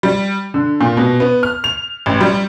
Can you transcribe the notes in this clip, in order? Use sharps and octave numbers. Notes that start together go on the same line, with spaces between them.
G3
D3
A#2
B2
B3
F6
F7
A1
G3